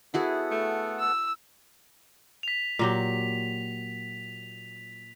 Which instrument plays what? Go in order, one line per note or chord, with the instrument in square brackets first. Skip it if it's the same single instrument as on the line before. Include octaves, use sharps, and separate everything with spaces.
[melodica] B3 A4 F#5 [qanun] E4 F#4 G#4
[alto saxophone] A3
[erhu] E6
[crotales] B6 F7
[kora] A#2 F#3 G4